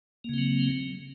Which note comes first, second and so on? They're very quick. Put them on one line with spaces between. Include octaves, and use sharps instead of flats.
A#3 C#3 C4 F#3